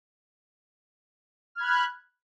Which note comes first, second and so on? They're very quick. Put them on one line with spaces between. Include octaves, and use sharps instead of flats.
F6 G#6 B5 F#6